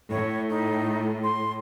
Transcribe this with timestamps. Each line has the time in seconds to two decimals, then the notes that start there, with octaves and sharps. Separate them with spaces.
0.11 A2 C#5
0.49 D#4
1.24 C6